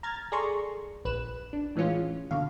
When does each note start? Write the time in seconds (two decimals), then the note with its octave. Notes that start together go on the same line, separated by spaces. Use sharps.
0.03 A#5 F6 G#6 A6
0.32 G#4 A4 D5 A#5 C6 C#6
1.05 A#1 B4 F#6 E7
1.53 D4
1.75 A2 E3 G#3 C#4 F4
2.31 B2 D3 F5